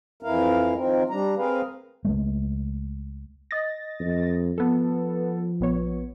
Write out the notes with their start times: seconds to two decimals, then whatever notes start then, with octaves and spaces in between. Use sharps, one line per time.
0.23 F2 E3 E4 A#4 F5
0.75 D#3 F3 C4 A#4
1.10 G3 D4 A#5
1.37 C4 G#4 A#4 B4 F5
2.05 C#2 G#3 A3
3.51 D#5 A6 A#6
4.00 F2
4.58 F3 B3 A4
5.60 A#1 B3 C#5